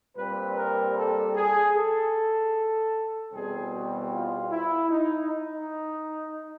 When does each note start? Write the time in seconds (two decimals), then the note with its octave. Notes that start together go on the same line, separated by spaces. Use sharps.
0.17 A#2 G3 C4 B4
0.56 A#4
0.96 A4
1.35 G#4
1.75 A4
3.32 E2 B2 G3 C4 G#4
3.71 F#4
4.11 F4
4.51 E4
4.89 D#4
5.29 D#4